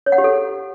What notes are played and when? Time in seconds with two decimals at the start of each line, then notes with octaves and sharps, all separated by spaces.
0.06 C#5
0.12 F#5
0.18 G4
0.24 A4